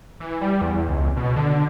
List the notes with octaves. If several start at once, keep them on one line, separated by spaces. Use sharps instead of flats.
E3
G3
E2
C#2
B2
D3